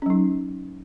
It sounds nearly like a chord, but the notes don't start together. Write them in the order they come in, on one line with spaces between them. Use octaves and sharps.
C#4 F#3 D#4